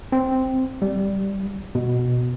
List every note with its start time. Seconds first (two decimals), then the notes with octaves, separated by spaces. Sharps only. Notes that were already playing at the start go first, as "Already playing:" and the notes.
0.12 C4
0.82 G3
1.75 B2